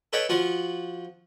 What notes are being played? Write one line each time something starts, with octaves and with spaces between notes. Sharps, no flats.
A4 B4 C#5 D#5 G5
F3 F4 F#4